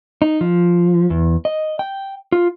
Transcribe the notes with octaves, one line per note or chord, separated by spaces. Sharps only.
D#4
F3
E2
D#5
G5
F4